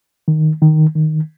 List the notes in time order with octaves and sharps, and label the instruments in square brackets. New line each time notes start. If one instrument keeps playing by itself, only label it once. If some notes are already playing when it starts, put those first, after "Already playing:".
[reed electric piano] D#3
D#3
D#3